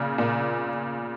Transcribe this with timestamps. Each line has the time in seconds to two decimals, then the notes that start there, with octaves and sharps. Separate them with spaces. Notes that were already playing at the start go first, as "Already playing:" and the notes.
Already playing: A#2 C#3
0.18 A#2